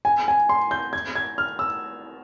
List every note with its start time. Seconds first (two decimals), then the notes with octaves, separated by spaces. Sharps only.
0.05 G#5
0.28 G#5
0.49 C6
0.71 G6
0.93 G#6
1.16 G#6
1.38 F6
1.59 E6